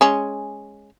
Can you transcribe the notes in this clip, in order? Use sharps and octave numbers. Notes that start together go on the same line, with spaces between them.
G#3 C#4